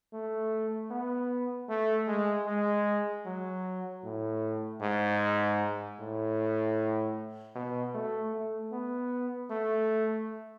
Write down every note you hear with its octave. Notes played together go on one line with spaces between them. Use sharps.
A3
B3
A3
G#3
G#3
F#3
A2
G#2
A2
B2
A3
A3
B3
A3